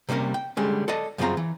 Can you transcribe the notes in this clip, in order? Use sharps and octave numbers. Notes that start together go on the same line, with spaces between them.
C3 G3 A#3 C#4 A#4
G5
D3 G3 G#3 C#4
A4 D5 D#5 A5
F#2 C#3 G3 C4 F4 A#5
E3